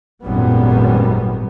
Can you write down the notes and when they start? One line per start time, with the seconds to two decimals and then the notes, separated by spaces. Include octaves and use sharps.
0.22 G#1 F#2 A#2 G3 B3